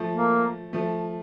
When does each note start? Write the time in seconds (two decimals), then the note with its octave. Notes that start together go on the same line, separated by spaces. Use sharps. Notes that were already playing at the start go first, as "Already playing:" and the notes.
Already playing: F3 A3
0.12 A#3
0.73 F3 A3